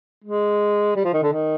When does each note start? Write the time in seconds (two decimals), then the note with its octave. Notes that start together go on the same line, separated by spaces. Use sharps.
0.24 G#3
0.96 G3
1.05 F3
1.13 D#3
1.23 D3
1.32 D#3